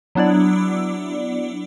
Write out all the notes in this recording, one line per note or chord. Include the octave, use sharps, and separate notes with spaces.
F#3 B3 D4 E4 D5